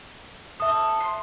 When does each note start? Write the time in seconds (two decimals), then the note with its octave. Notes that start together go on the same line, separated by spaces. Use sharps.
0.60 A4 E5 D#6
1.00 C6